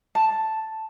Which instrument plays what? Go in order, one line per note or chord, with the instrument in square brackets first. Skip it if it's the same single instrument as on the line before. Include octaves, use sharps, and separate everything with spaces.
[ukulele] A5